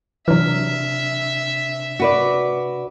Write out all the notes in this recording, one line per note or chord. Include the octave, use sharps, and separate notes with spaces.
C3 E3 F#3 D4 E5 F6
F#4 B4 D5